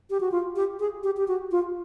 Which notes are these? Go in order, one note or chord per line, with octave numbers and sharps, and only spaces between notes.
G4
F#4
F4
G4
G#4
G4
G4
F#4
F4